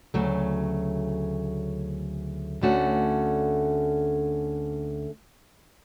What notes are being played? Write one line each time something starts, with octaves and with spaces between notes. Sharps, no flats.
D2 C#3 F#3 A3
D2 D3 A3 C#4 F#4